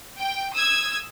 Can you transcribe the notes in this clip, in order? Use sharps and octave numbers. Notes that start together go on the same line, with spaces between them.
G5
D#6 E6 G#6